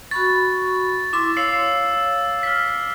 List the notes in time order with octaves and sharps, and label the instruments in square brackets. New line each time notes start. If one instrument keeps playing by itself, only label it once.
[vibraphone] F#4 B5 C#6 [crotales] A6
[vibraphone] E4 C6 [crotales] D6
[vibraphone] C#5 F5 [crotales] E6 C7
[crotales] F6 B6